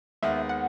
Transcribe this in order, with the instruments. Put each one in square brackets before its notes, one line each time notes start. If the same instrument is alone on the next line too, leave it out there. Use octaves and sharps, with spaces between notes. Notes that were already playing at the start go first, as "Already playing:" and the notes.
[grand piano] D#2 D#3 G#3 B3 [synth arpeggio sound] E5
[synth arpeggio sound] F#5